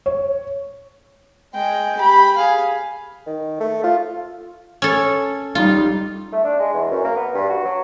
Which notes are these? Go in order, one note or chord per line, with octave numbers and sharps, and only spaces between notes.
C#5
G#3 G5
G4 B5
G#4 F5
D#3
A3
F4
C#4 A4
G3 D#4 F4
A3
D4
G#3
E2
F#2
A#3
B3
G2
F#4
F#3